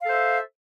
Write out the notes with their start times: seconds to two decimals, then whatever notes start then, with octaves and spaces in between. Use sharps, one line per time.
0.02 F5
0.06 A4
0.09 C5
0.12 E5